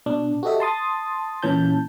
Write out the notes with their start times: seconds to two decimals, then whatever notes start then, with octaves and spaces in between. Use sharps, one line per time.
0.06 B2 D4
0.43 F#4 G4 A4 D#5 E5
0.60 A5 C6 D#6 A6
1.43 A#2 E3 C#4 A5 G6